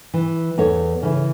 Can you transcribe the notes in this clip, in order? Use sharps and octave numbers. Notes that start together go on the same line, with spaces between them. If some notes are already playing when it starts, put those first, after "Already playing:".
E3
E2 A4 C#5
C#3 E3